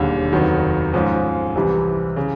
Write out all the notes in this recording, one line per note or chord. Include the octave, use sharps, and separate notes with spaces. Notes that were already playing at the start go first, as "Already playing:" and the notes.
Already playing: E1 D#2 D3 G3
F1 D#2 D#3 F#3 B3
G#2 F3 G#3 C#4
C2 C3 E3 G3 C4
C#3